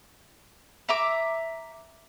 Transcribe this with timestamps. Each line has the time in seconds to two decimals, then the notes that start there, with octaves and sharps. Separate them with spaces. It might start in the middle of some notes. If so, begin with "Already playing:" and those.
0.89 E5 A#5 D6